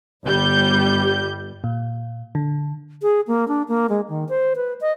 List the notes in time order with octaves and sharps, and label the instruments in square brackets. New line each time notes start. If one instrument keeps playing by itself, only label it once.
[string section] G1 G3 G6
[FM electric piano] A#2
D3
[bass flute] G#4
A#3
D4
A#3
G#3
D#3
C5
B4
D#5